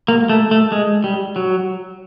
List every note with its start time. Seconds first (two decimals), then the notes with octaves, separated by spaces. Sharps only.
0.08 A#3
0.29 A3
0.51 A3
0.72 G#3
1.04 G3
1.36 F#3